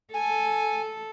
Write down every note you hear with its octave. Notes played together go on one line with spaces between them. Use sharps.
A4 G#5